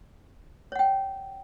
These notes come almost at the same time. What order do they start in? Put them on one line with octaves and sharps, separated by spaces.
C#5 F#5 G5